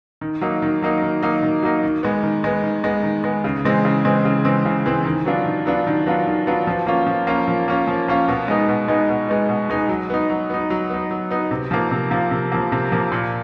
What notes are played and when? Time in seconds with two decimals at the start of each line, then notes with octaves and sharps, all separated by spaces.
0.21 D#3
0.41 F#3 A#3 D#4
0.62 D#3
0.82 F#3 A#3 D#4
1.02 D#3
1.23 F#3 A#3 D#4
1.43 D#3
1.63 F#3 A#3 D#4
1.83 D#3
2.03 G#3 B3
2.23 D#3
2.44 G#3 B3
2.63 D#3
2.84 G#3 B3
3.03 D#3
3.24 G#3 B3
3.44 C#3
3.64 E3 G#3 C4
3.85 C#3
4.05 E3 G#3 C4
4.25 C#3
4.45 E3 G#3 C4
4.65 C#3
4.86 E3 G#3 C4
5.05 D#3
5.26 F#3 B3 D4 F4
5.46 D#3
5.66 F#3 B3 D4 F4
5.87 D#3
6.06 F#3 B3 D4 F4
6.27 D#3
6.47 F#3 B3 D4 F4
6.67 F3
6.87 A#3 C#4 F4
7.07 F3
7.27 A#3 C#4 F4
7.48 F3
7.68 A#3 C#4 F4
7.87 F3
8.08 A#3 C#4 F4
8.28 B2
8.48 G#3 B3 D#4
8.69 B2
8.88 G#3 B3 D#4
9.09 B2
9.29 G#3 B3 D#4
9.49 B2
9.70 G#3 B3 D#4
9.89 F#3
10.10 B3 D#4
10.30 F#3
10.50 B3 D#4
10.70 F#3
10.90 B3 D#4
11.11 F#3
11.31 B3 D#4
11.51 C3
11.71 F3 A#3
11.91 C3
12.11 F3 A#3
12.31 C3
12.52 F3 A#3
12.72 C3
12.92 F3 A#3
13.12 A#2